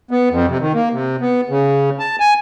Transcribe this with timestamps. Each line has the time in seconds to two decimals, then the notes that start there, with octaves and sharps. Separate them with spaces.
0.11 B3
0.30 F2
0.48 C3
0.60 D#3
0.74 A#3
0.92 C3
1.21 B3
1.50 C#3
1.99 A5
2.20 G#5